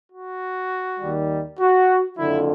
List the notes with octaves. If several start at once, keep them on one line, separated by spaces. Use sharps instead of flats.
F#4
D#2 D#3 G3
F#4
F#1 F2 D3 F3 E4